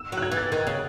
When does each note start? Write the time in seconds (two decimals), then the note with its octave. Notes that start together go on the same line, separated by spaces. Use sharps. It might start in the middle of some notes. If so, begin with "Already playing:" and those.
Already playing: E6
0.12 F#3
0.17 F#6
0.22 G#6
0.32 E3
0.37 A6
0.52 D#3 G#6
0.67 C#3 F#6